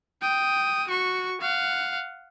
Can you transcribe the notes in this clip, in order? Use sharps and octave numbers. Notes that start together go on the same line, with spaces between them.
G5 D#6
F#4 C#6
F5 F#5